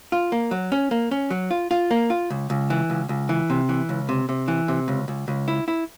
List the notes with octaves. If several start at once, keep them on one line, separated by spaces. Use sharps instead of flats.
F4
A#3
F#3
C#4
A#3
C#4
F#3
F4
F4
A#3
F4
C#2
C#2
E3
C#2
C#2
E3
C3
E3
C#2
C3
C3
E3
C3
C#2
C#2
C#2
E4
E4